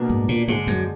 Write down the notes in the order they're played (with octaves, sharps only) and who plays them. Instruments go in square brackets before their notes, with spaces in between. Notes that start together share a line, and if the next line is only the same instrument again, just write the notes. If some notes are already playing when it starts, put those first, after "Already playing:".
Already playing: [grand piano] B2 A#3 D4
[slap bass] G#2
A#2
[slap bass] G#2 [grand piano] D3 G#3 D4
[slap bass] F#2